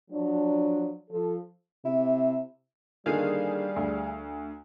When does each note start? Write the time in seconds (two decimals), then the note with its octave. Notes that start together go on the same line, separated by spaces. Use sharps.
0.10 F3 F#3 D4
1.11 F3 A4
1.85 C3 E4
3.06 D3 D#3 G3 A#3 G#4 F5
3.76 D2